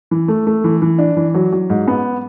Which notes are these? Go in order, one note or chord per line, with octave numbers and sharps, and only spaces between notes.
E3
A3
A3
E3
E3
D4
E3
F#3
F#3
G#2
B3